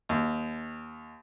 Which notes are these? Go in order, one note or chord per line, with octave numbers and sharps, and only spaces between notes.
D#2